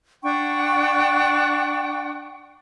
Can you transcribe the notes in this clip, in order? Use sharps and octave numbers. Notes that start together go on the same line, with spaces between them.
D4 F#5 G5 C#6